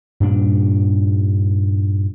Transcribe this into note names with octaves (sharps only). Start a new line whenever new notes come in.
G2 A#2 D4